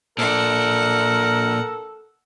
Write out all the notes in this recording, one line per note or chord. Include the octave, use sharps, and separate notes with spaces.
A#2 D4 A4 A#4 F#5